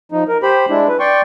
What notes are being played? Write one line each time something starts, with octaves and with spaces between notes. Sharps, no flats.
F3 D#4
A#4
G4 C5 B5
G#3 D4 E4
B4
D5 G5 C6 C#6